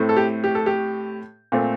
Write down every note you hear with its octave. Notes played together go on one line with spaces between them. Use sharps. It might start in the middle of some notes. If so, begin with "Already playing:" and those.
Already playing: A2 A3 C4
A4
G4
G4
A4
G4
A#2 A3 C4